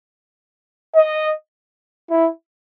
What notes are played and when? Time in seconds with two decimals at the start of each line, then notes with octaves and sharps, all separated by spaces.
0.96 D#5
2.10 E4